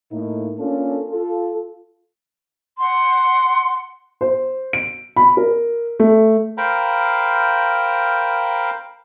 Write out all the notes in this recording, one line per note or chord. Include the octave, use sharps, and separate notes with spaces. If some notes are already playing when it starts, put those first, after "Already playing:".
A2 A#3 D#4
A#3 C#4 D4 F4 A4 A#4
F4 A4
F#5 C6
C5
D7
B5
A#4
A3
A#4 C5 F5 G5 A#5 B5